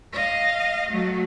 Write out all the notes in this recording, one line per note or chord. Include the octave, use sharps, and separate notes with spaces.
D#5 F5
F#3 A3